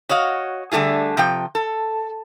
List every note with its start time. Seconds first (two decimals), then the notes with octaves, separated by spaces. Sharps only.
0.09 F#4 C#5 D#5 F5
0.72 D3 G3 A3 F4 G#4
1.17 C3 F3 G5
1.55 A4